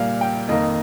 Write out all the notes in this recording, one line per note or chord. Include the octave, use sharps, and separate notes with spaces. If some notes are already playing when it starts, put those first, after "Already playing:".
Already playing: A#2 G3 A#3 F5
G5
F2 D#3 A#3 D#5